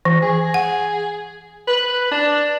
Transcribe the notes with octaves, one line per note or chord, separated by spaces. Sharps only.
E3
G#4
F#5
B4
D4